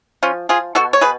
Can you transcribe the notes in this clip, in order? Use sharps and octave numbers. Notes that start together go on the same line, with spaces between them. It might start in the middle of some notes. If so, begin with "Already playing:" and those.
F3 C#4 F4
F3 F4 G#4
B2 F#4 A4
C#5
B2 G#4 B4